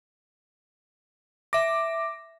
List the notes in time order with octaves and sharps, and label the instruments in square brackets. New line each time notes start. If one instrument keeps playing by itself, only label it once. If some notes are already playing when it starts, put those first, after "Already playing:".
[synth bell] E5 A#6 [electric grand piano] D6